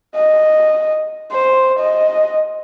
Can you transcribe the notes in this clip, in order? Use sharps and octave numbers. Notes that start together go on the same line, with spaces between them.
D#5
C5
D#5